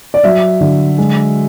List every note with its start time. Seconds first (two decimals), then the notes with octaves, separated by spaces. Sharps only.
0.14 D5
0.24 F#3 E5
0.61 D3
0.98 G#3